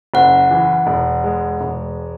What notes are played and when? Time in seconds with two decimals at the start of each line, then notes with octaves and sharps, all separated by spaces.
0.14 F#1 F#5
0.51 E3
0.87 E1
1.24 G#3
1.61 E1